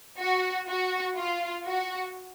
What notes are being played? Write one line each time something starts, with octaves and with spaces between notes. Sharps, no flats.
F#4
F#4
F4
F#4